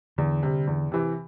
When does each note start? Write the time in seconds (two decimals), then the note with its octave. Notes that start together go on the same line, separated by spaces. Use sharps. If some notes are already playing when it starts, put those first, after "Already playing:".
0.18 E2 D3
0.43 C3 G3
0.67 E2
0.92 C3 E3